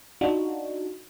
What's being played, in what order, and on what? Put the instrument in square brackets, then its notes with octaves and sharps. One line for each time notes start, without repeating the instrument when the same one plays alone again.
[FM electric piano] D4 D#4 F4 F#4